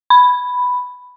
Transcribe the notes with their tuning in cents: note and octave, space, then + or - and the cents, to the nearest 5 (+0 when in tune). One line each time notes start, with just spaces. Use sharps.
B5 +5